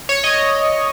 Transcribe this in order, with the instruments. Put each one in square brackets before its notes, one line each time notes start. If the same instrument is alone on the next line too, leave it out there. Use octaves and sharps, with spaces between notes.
[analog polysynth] C#5
D#5